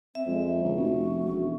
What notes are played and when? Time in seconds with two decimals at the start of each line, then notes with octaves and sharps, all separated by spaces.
0.15 C4 E5
0.27 F2 G#3
0.63 C#2 D3
0.76 F1 F#4
1.24 E1